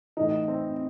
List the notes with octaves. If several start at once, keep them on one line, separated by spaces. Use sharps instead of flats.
A2 E3 D#4
C4